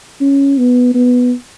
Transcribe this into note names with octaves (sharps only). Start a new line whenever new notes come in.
C#4
B3
B3